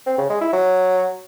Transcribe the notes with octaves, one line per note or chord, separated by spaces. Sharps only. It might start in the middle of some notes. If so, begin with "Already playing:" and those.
C4
C#3
G#3
E4
F#3